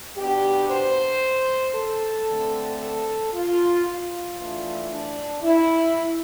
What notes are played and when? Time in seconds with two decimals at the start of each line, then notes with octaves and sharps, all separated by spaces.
0.18 B2 B3 D4 G4
0.70 C5
1.75 A4
2.28 D3 A3 C4
2.81 A4
3.34 F4
3.85 F4
4.38 E3 A3 D4
4.90 D4
5.43 E4